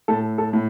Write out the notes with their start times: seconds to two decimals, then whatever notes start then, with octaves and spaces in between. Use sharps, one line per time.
0.08 A2 A4
0.38 A4
0.53 A2